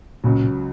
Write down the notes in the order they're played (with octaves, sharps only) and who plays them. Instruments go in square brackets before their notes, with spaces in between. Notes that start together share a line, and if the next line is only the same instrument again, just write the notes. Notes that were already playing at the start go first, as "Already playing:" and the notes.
[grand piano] C#2 C#3 F#3 [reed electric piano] A#2